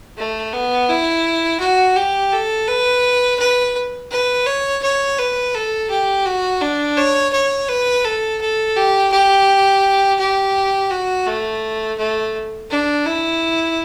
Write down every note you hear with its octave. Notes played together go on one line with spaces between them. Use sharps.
A3
B3
E4
F#4
G4
A4
B4
B4
B4
C#5
C#5
B4
A4
G4
F#4
D4
C#5
C#5
B4
A4
A4
G4
G4
G4
F#4
A3
A3
D4
E4